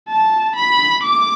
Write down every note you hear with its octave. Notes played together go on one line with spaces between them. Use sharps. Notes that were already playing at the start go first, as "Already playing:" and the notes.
A5
B5
D6